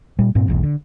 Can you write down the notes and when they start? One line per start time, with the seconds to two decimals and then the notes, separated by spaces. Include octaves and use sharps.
0.19 A#2 G3
0.35 G2 A#2 C4
0.48 E1 B1 E2
0.63 D3